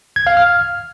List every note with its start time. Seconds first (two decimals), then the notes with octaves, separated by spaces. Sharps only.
0.16 G#6
0.27 F5
0.37 F6